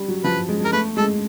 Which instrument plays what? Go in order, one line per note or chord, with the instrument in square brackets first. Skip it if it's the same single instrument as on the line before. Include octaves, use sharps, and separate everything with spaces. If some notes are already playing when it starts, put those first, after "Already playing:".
Already playing: [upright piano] G3
F#3
[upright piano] F3 [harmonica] B4
[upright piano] G#3
G#3
[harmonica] A#4
[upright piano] A3 [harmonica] B4
[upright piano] G#3 [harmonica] A4